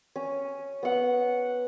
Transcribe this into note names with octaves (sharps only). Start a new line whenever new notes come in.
C#4
B3 F#5